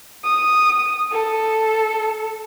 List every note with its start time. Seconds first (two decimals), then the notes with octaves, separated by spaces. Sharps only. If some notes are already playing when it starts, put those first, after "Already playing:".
0.24 D#6
1.13 A4